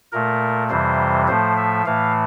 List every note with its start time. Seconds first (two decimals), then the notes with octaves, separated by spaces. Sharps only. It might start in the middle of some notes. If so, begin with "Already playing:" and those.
0.12 A#2 A3 A#4
0.70 F2 C3 E3 G3 C5
1.28 A2 F3 A3 C5
1.57 E5
1.86 A2 E3 A3 F5